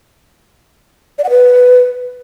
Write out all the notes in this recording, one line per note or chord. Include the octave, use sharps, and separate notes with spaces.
D5
F#5
B4